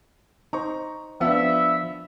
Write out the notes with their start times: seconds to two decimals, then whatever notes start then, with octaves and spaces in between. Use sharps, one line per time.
0.53 D#4 C5 A#5 C#6
1.21 F3 B3 D4 E5